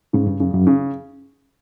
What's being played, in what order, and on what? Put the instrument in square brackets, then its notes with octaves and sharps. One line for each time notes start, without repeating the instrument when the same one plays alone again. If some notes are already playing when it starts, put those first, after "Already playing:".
[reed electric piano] G#2 [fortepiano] C#3
[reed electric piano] G2
[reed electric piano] F#2 [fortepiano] C#3
[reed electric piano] F#2
[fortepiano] C#3